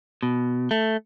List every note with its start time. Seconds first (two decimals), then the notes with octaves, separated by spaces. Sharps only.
0.23 B2
0.71 A3